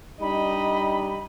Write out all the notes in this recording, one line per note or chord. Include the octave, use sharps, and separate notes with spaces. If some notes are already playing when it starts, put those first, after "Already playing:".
G3 D4 D#4 D#5 B5